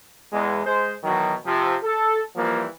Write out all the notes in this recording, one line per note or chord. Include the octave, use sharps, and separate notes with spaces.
E2 G#3
G#3 C5
B2 D#3 E3 F#3
C3 F3
A4
E3 F3 G3 A#3